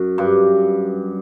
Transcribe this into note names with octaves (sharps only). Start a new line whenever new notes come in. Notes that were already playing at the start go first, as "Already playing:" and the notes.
Already playing: F#2
G2